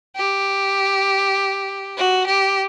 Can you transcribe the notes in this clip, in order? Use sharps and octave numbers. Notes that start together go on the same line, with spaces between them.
G4
F#4
G4